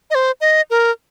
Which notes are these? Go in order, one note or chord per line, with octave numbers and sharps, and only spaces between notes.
D#5
C5
D#5
A#4